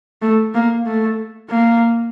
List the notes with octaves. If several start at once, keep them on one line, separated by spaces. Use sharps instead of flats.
A3
A#3
A3
A#3